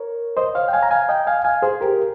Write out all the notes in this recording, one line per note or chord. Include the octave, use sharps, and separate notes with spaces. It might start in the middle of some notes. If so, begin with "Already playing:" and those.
Already playing: A#4 C#5
C5 D#5
C#5 F5
G5
F5 G#5
A#5
F5 G#5
D#5 G5
F5 G#5
F5 G#5
G#4 C5
G4 A#4